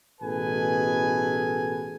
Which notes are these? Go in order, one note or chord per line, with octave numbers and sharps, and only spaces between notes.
A1 B2 G#4 A4 B4 G#5